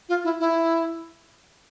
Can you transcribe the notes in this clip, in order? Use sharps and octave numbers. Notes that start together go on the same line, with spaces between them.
F4
E4
E4